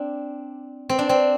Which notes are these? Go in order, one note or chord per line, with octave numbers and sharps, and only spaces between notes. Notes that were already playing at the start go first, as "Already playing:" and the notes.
Already playing: C4 D4
C4
D4
C4